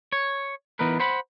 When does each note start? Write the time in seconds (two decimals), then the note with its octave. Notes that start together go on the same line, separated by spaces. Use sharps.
0.12 C#5
0.79 E3 B3 D#4 A#4 B4
1.00 C5 F#5 B5